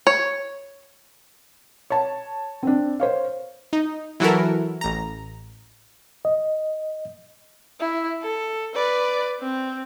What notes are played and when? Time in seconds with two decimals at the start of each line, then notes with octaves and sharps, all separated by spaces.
0.07 C#5
1.90 C#5 A5
2.63 C4 D4
3.00 C5 C#5 F5
3.73 D#4
4.20 E3 F#3 E4 F#4 A4 A#4
4.81 A1 A#5
6.25 D#5
7.80 E4
8.22 A4
8.75 B4 D5
9.40 C4